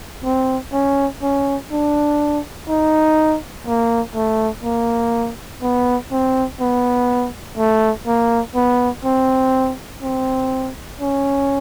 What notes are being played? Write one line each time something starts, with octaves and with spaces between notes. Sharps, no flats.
C4
C#4
C#4
D4
D#4
A#3
A3
A#3
B3
C4
B3
A3
A#3
B3
C4
C4
C#4